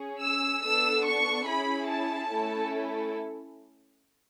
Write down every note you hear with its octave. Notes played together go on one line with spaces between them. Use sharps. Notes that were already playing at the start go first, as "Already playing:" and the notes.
Already playing: C#4 G#4
E6
B3 D4 A4 E6
C#6
C#4 E4 G#4 B5
A5
A3 C#4 E4 A4